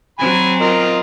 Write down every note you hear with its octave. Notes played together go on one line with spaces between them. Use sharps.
F#3 C4 G#5 B5
F4 A#4 D#5